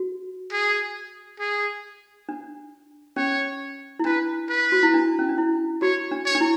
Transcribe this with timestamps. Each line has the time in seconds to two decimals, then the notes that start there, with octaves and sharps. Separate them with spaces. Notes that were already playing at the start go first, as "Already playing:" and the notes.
Already playing: F#4
0.52 G#4
1.40 G#4
2.29 D4
3.17 C#4 C#5
3.99 E4
4.05 D4 B4
4.49 B4
4.72 F#4
4.83 E4
4.94 D4
5.19 C#4
5.29 D4
5.38 E4
5.82 F#4 C#5
6.11 D4
6.26 C#5
6.35 D4
6.41 E4